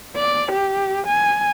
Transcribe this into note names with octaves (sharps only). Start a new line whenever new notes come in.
D5
G4
G#5